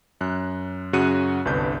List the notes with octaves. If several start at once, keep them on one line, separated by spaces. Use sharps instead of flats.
F#2 F#6
F#2 C#3 F#4 F#6 C#7 D#7
G1 C2 G2 B4 G6